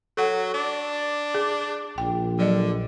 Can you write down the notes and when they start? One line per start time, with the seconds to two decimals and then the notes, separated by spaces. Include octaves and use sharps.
0.17 F#3 A4 F#5
0.54 D4
1.34 G#4
1.98 A#1 G5
2.39 D3 F#3 D5 D#5